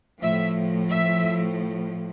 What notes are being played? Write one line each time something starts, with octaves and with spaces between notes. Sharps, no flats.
A2 F3 E5
E5